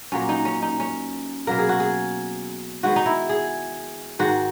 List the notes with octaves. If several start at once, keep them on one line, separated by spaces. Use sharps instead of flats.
A#2 F#3 A#3 C#4
D#4
C#4
D#4
C#4
B2 F#3 A#3 A#4
G#4
F#4
G#4
D#3 G#3 B3 F#4
D#4
E4
G#4
G#2 D#3 G#3 F#4